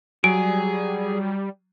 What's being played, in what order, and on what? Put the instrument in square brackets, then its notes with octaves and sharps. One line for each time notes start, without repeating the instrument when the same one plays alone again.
[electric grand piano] F#3 [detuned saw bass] G3 [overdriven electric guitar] G#4 G#5 [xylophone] D7